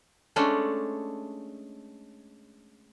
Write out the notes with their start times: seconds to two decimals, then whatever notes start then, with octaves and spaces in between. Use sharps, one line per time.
0.36 G#3 A3 C#4 D4